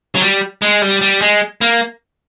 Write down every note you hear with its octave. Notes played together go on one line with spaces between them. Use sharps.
F#3
G3
G#3
G3
G3
G#3
A#3